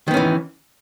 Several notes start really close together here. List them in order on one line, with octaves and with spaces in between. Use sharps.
D#3 B3 C#4 E3